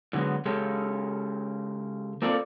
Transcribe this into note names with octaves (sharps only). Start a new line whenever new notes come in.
A2 D3 F#3 G#3 B3
C#3 G#3 C#4 G4 A4
A#3 C4 F4 A4 D5